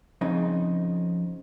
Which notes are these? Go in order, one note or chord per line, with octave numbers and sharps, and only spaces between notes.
F2 C#3 D#4